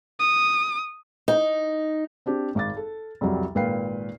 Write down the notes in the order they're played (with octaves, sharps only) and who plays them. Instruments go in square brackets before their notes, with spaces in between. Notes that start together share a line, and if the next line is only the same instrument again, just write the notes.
[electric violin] D#6
[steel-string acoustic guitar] D#4
[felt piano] C4 D4 G4
G#1 D6 A6
A4
C2 F2 F#3 G3
G#1 A#2 B4 F5 G5 C7